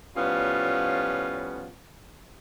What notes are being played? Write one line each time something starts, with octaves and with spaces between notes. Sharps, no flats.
A2 F3 G3 B3 C#4 F4